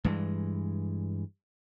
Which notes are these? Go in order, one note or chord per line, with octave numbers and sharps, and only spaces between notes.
G2 E3 G#3